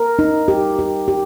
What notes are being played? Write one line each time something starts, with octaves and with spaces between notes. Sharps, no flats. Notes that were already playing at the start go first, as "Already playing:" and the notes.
Already playing: A#4
D#4
G4
G4
G4